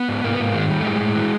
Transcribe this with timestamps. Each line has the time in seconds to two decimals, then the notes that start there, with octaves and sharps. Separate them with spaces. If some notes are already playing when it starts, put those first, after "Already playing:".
Already playing: B3
0.09 G#2
0.24 G#2 A#3
0.33 B3
0.40 G#2 A#3
0.54 D#3 G#3
0.70 G3
0.79 A3
0.85 A2 G#3
1.00 A2
1.15 E3